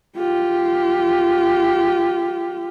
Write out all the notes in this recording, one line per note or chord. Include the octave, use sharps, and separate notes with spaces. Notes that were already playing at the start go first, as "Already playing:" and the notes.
F4 G4